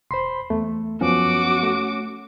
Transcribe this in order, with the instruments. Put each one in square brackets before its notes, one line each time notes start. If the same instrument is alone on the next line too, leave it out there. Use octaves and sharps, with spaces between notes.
[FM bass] E1 [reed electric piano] C5 B5 C6
[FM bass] E2 [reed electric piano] A3
[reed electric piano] F#2 F3 B3 [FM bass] C#4 [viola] F#4 D6
[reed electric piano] A3